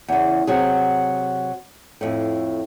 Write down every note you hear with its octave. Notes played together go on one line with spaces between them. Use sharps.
E2 C#3
C3 F#3 G#4
F2 A2